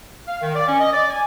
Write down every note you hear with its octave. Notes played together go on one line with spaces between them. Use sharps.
F5
D#3
D5
C#4
D#5
D5
G#5